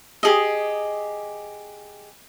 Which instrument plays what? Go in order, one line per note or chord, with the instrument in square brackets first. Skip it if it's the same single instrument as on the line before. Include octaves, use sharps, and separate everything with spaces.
[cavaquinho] G4 G#4 D#5